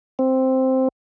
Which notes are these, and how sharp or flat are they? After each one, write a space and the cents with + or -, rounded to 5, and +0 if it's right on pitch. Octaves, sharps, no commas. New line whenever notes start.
C4 +0